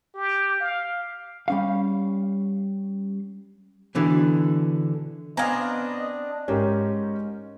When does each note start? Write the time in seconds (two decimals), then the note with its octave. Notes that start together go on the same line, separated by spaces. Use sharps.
0.14 G4
0.60 F5
1.48 G3 C#4 F5
3.95 B2 D3 E3
5.37 B3 C4 D4 D#5 F5 G#5 A#5
6.48 G#2 C#4 G4 A#4